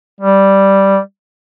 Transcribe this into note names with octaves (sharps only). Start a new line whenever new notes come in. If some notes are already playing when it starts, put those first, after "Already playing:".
G3